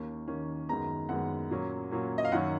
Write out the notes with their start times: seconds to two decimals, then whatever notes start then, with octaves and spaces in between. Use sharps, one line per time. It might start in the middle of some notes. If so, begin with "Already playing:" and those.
Already playing: D#2 D#3 A#3 C#4
0.28 D#2 D#3 A#3 C#4
0.69 F#2 D#3 G#3 B3 A#5
1.09 F#2 D#3 G#3 B3 F#5
1.50 A#2 F#3 A#3 C#4
1.91 A#2 F#3 A#3 C#4
2.18 D#5
2.25 F5
2.32 F#2 D#3 F#3 C#4 F#5